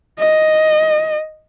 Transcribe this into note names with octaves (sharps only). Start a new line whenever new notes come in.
D#5